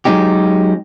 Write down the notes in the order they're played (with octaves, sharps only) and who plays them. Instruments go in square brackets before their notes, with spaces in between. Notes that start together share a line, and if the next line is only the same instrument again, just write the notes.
[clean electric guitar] F#3 G#3 C#4 D#4 G4